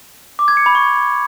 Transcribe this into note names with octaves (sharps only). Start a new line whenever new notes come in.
D6
G#6
C#7
B5
C#6